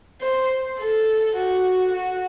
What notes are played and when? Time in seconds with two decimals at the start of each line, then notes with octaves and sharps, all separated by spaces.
0.22 C5
0.79 A4
1.35 F#4
1.93 F#4